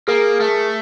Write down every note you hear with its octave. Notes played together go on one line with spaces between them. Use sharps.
A#3 G#4 A#4
A3